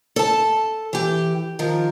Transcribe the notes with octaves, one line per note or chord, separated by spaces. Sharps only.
A4 A5
E3 G4
D#3 F3 A#4